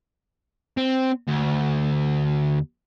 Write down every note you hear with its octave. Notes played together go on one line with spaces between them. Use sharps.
C4
D2